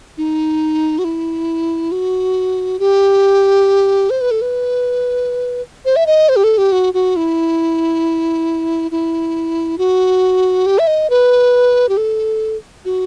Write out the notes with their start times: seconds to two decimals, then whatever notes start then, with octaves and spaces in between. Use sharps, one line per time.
0.18 D#4
0.99 F#4
1.04 E4
1.92 F#4
2.79 G4
4.10 C5
4.21 B4
4.31 A4
4.42 B4
5.85 C5
5.96 E5
6.07 D#5
6.29 C5
6.36 G4
6.44 A4
6.58 G4
6.72 F#4
6.94 F#4
7.16 E4
8.91 E4
9.78 F#4
10.66 G4
10.79 E5
10.87 D#5
11.10 B4
11.89 G4
11.97 A4
12.85 F#4